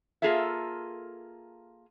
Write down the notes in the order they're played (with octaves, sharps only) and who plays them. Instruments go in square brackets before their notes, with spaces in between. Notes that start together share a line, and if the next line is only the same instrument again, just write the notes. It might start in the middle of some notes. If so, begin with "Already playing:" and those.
[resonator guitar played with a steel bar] A#3 F4 G#4 A4 E5